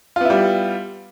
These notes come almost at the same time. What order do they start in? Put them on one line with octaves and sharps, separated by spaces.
F4 B3 E4 G3